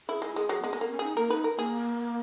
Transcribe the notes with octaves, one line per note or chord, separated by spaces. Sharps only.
E4 G#4
G#3 E4
G#3 G#4
F#3 G#4
G#3 B3
G#3
B3
A#3
C#4
D#4 G#4
A#3 A#4
D#4 B4
A#4
A#3 G#4